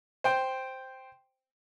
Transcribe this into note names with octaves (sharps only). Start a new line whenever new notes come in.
C5 G5